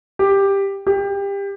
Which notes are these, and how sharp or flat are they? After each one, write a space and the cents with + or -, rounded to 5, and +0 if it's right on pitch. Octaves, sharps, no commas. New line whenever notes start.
G4 +10
G4 +25